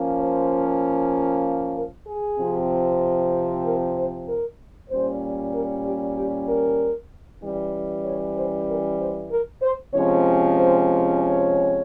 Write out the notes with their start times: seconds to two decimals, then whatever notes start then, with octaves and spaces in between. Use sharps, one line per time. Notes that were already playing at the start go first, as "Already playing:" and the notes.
Already playing: F3 A#3 C#4
0.18 C5
1.75 A#4
2.07 G#4
2.38 C3 F3 C4
3.65 A#4
3.96 C5
4.27 A#4
4.90 A#2 G3 C#4 C5
5.54 A#4
5.84 G4
6.17 G4
6.48 A#4
7.42 E3 G3 C#4
8.05 C#5
8.37 C5
8.68 A#4
9.00 C5
9.31 A#4
9.62 C5
9.94 C3 F3 G#3 C#4 C#5
10.57 C5
11.20 C#5